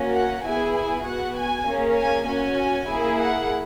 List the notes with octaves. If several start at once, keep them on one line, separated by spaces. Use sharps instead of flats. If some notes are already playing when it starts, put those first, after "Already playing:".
Already playing: A#3 C#4 F#4
F#5
B3 E4 G#4 G#5
G#5
B3 F#4 F#5
G#5
A#3 C#4 G#4
G#5
C#4 F#4 G#5
A#3 E4 G#4
F#5